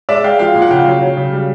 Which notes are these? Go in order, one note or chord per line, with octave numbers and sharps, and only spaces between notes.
G#3 D5 E5
G#3 F5 G5
F3 F5 G5
A#2
F#5
C#3 F5 G5
F#3
F#3
C#3
G3